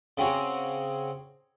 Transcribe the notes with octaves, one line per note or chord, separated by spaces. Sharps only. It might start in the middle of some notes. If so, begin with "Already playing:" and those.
C#3 C4 F#4 G#4 C#5